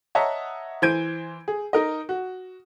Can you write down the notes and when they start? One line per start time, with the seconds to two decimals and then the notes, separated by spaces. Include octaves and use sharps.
0.15 C#5 D#5 E5 F#5 A5 A#5
0.82 E3 C5 G6 G#6 D7 D#7
1.48 G#4
1.73 D#4 A#4 D#5
2.09 F#4